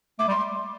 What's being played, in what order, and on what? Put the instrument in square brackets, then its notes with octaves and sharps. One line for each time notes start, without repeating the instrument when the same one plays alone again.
[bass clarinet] A3 [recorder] D6
[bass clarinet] G3 [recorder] C6